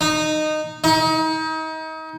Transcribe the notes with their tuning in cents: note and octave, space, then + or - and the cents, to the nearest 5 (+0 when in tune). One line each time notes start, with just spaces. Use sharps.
D#4 -15
D#4 +35